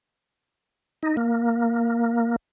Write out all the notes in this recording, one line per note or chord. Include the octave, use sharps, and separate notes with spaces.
D#4
A#3